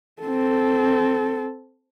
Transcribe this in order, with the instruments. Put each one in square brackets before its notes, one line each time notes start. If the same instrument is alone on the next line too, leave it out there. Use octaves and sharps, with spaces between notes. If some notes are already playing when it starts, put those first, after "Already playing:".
[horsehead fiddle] C4 A4